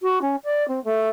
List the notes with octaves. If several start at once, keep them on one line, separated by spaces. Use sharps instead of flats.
F#4
C#4
D5
C4
A3